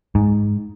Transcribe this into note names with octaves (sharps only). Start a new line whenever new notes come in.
G#2